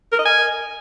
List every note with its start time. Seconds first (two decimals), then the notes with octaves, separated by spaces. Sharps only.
0.12 A#4
0.19 D#5
0.25 G#5